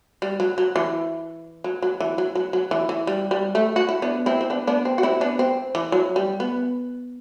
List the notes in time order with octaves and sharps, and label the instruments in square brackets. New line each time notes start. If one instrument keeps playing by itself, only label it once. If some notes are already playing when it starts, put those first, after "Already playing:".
[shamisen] G3
F#3
F#3
E3
F#3
F#3
E3
F#3
F#3
F#3
E3
E3
G3
G3
A3
F#4
E4
B3 D4
C4 E4
C4
B3 D4
B3 D4
C4
F#4
C4 E4
B3 D4
C4
E3
F#3
G3
B3